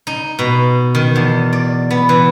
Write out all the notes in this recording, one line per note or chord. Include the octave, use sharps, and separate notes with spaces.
D#4
B2
D#3
E2
D5
B3
E3